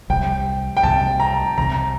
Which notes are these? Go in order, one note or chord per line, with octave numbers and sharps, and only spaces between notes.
C2 C3 F3 G5
G5
C2 C3 F3 A5
A#5
C2 C3 F3 A#5